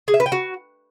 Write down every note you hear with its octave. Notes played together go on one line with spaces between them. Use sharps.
G#4
E5
B4
G5
F#4